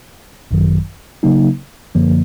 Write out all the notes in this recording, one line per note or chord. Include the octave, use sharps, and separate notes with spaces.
G#1 F#2 D#3 F#3
C#3 F#3 A#3 D#4
F#2 D3 F3 A#3